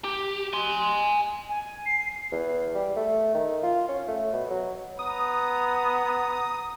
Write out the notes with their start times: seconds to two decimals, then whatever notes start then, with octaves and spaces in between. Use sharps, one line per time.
0.04 G4
0.53 G#5 C6
1.49 G#5
1.86 C7
2.31 E2
2.75 G3
2.96 A3
3.34 D#3
3.63 F4
3.89 C#4
4.08 A3
4.33 B2
4.50 F#3
4.99 B3 A#5 D#6